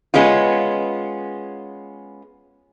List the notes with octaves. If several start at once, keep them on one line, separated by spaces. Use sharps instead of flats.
G#3 B3 C#4 F4